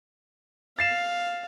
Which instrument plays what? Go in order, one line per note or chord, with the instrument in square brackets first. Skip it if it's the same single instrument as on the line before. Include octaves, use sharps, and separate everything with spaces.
[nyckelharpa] F5 [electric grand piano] A6 C7 E7